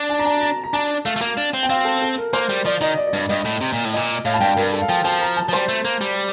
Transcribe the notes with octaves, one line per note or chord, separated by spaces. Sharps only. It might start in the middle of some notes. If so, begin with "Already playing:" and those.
Already playing: D4
A5
A#5
A5
A#5
A#5
D4 A5
A3 F5
A3
A#3 F5
D4
C4
G5
C4 F5
A4
A4
A#4
A#3 C5
G3
F3 D5
D#3 D#5
D5
D#5
G2 D5
G2 D#5
A2
C3
A#2
A2
A#2 D#5
A2 F5
A5
G2 G5
G2 A#4
A4
F5
F3 G5
F3 A5
A#5
A5
F3
G3 C5
A3
A#3
G3